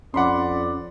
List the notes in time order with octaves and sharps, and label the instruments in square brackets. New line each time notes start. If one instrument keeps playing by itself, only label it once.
[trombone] F2 [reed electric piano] C#4 [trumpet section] D5 [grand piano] F#5 B5 C6